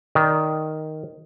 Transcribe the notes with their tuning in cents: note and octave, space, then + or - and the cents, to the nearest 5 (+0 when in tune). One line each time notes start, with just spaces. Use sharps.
D#3 +0 D5 +0